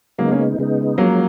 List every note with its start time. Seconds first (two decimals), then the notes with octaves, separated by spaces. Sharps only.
0.18 C#3 F#3 G#3 A#3 B3 D#4
0.31 A#3 C#4
0.58 C#3 G#3 B3 D#4
0.98 F3 F#3 G#3 A#3 C#4